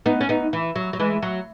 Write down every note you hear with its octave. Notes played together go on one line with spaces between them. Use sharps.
B3 D#4
C#4
B3 D#4
E3
F#3
F#3
E3 G#3
F#3